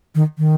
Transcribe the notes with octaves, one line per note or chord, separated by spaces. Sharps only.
D#3
D#3